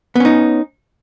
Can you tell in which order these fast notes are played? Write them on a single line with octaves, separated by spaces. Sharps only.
B3 C#4 D#4